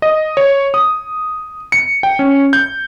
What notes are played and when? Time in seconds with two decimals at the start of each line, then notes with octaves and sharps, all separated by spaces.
0.02 D#5
0.37 C#5
0.74 D#6
1.72 C#7
2.03 G5
2.19 C#4
2.53 G6